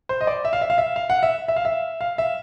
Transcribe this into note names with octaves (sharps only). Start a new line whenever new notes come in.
C5
D#5
D5
E5
F5
E5
F5
E5
F5
F#5
E5
E5
F5
E5
F5
E5